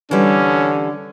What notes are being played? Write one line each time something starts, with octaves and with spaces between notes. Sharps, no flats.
D3 E3 G3 C#4